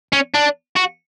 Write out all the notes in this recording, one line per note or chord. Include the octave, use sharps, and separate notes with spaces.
C#4
D4
F#4